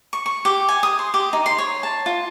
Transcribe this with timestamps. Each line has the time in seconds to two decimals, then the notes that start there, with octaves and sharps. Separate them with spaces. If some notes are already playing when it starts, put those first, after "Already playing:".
0.13 C#6
0.26 C#6
0.45 G4
0.68 G#5
0.83 D#6
0.99 C6
1.14 G4
1.33 D#4
1.46 C6
1.58 C#5
1.83 A5
2.06 F4